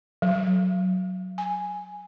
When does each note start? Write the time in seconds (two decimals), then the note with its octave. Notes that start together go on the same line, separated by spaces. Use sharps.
0.22 F#3
1.38 G#5